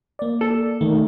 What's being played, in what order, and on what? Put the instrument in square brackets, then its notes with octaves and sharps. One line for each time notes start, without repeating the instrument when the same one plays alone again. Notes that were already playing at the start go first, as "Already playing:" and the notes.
[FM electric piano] A#3 D5
[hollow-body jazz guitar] A4
[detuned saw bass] D#3 [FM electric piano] A3